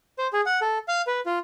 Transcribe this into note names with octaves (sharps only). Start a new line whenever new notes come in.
C5
G#4
F#5
A4
F5
B4
F4